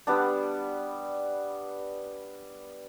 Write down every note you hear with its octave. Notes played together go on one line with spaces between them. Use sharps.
G3 B3 D4